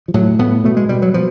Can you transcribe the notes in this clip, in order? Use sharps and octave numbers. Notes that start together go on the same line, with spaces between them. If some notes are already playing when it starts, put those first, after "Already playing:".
F3
A2 F#3
A2 B3
B2 A3
G#3
B2 G3
F#3
B2 F3